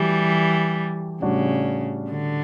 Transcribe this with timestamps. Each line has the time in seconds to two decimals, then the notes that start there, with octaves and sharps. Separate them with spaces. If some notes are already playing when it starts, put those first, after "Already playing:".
Already playing: E3 F#3 G3 A3 G4
1.21 A2 C#3 G3 D4 F#4
2.10 D3